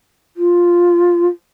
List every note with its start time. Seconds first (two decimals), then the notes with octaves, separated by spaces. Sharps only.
0.37 F4